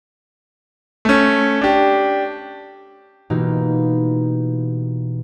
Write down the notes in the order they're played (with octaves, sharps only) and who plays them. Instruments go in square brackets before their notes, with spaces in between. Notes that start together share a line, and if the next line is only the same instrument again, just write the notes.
[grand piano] A3 C#4
D4 G4
[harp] B2 E3 A#3 D#4 F4 G4